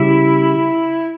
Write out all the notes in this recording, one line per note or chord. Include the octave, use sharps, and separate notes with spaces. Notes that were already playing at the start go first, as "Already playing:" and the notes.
Already playing: C#3 G3 E4